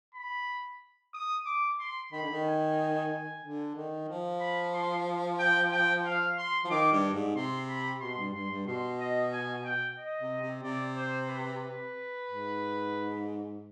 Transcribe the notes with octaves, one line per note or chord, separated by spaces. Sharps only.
B5
D#6
D6
C6
D#3 B5
D3
D#3
G#5
D3
D#3
F3
B5
C6
G5
G5
F5
C6
F3
D#3 D6
G2
G#2
C3 C6
B5
B2 C6
G2
G2 C6
G2
B2 C6
D#5
G#5
G5
D#5
C3
C3
C3 D5
C5
B4
G#2